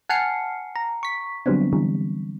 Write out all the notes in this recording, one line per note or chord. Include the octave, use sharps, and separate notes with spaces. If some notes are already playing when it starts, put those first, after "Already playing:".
F#5 G#5 A5 F6 C7 C#7
A#5
C#6 B6
D3 F#3 G3 B3 C4 D4
D3 E3 G3